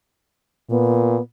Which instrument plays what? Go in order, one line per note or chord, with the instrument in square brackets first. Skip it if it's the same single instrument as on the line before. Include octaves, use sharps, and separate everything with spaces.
[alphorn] A#2 [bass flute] B3